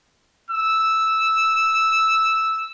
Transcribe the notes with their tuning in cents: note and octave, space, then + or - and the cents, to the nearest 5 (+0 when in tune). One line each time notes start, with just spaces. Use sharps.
E6 -5